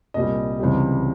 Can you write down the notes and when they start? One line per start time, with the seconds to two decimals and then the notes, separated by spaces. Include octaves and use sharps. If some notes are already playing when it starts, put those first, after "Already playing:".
0.14 C2 A#2 G3 D#5
0.59 C#2 C3 E3 G3